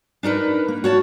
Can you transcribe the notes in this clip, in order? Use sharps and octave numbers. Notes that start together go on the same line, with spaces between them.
D4 D#4 A#4 B4
A#3
F#4 C#5 A5